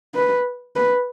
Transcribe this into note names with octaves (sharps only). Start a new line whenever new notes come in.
B4
B4